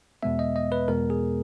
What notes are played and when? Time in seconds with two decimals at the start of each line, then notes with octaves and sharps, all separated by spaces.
0.23 E2 B2 G#3 B3 E5
0.39 D#5
0.56 D#5
0.72 B4
0.88 E2 B2 G#3 B3 A#4
1.10 G#4